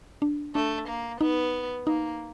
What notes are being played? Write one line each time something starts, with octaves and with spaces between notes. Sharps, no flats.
D4
A3 D4
A#3
B3 D#4
A#3 D#4